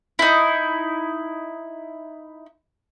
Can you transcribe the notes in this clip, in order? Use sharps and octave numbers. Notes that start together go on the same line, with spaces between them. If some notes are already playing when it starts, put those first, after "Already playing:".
D#4 E4